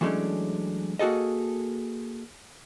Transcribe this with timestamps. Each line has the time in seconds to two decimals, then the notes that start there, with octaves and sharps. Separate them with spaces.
0.01 E3 F#3 G#3 A3 C#4 D4
0.99 A#3 F#4 G#4 A4 D#5